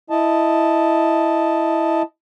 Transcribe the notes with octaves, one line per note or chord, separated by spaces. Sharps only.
E4 D#5 A5